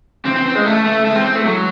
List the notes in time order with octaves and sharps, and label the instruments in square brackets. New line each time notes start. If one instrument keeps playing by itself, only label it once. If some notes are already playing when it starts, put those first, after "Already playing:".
[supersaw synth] C#3 E3 [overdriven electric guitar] C4
[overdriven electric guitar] C4
C4
G#3
A3
A3
[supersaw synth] E3 G#3 [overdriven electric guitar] A3
[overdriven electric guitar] C4
C4
A3
F#3